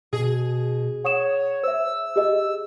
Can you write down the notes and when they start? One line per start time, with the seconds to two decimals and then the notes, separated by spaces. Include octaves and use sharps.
0.13 B2 G#4
1.04 C#5 F#5 D#6 E7
1.63 C5 E5 E6
2.16 G4 G#4 D#5